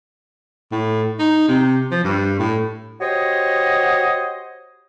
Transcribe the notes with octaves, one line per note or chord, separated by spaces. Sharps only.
A2
D#4
C3
F3
G2
A2
F#4 G4 C5 C#5 D#5